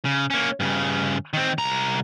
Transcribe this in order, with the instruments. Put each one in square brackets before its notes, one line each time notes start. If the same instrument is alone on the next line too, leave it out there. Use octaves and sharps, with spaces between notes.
[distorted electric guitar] C#3
A#3 C#4
G2 C#3
D#3 C4
C2 A#5